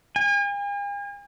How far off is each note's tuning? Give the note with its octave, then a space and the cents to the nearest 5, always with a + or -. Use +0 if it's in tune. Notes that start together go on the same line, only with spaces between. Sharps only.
G#5 -45